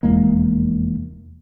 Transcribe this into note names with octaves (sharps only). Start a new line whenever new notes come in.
F1 E2 G#3 A#3